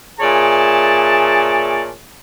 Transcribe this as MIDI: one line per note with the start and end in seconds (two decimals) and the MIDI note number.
0.20 1.91 46
0.20 1.91 68
0.20 1.91 73
0.20 1.91 74
0.20 1.91 76
0.20 1.91 81